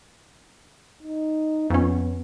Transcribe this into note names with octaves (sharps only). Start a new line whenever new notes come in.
D#4
F2 B3 C#4